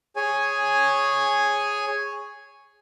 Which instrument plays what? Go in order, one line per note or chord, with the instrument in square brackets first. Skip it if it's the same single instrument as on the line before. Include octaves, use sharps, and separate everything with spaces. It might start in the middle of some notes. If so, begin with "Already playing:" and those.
[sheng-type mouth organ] G#4 C#5 G#5